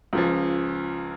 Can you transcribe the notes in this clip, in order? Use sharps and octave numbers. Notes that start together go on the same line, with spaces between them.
C#2 C#3 F3